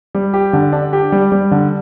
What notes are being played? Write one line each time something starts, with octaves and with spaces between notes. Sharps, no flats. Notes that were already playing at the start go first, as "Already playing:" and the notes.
G3
G4
D3
D4
G4
G3
G3
D3